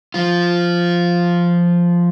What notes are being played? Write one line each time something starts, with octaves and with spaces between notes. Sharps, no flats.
F3 F4